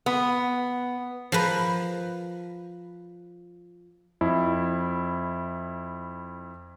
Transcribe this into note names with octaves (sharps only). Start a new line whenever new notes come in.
B3
F3 A#4 B4
F2 E4